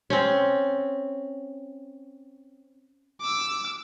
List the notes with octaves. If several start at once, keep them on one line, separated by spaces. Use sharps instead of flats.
C4 C#4
D6 E6